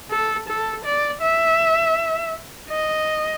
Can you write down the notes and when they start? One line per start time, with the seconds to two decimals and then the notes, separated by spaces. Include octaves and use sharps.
0.11 A4
0.48 A4
0.84 D5
1.22 E5
2.70 D#5